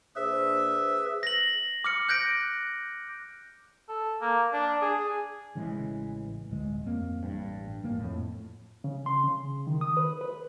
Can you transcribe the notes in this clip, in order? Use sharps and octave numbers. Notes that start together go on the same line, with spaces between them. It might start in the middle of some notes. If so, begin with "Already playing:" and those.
A#2 D4 G#4 B4 C5 E5
A#6 F#7
D6 F6 C#7
F#6 G6 A#6 D7
A4
A#3
D4
G#4
A1 C#3 E3 G#3
D1 G1 G#3
F2 A#3 C4
A1 G2
A1 G#2 A#3
F2 A2
C#3
C6
C#3
D#3
D#6
B4
B4